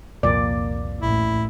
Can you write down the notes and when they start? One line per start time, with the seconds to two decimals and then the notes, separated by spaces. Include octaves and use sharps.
0.23 C2 F2 A#2 A#3 D5
1.02 A1 E4